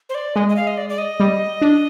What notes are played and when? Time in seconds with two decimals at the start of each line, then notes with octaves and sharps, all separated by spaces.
0.09 C5
0.15 D5
0.36 G#3 D#5
0.49 D#5
0.56 F5
0.67 D#5
0.77 D5
0.89 D5
0.98 D#5
1.20 G3
1.61 D4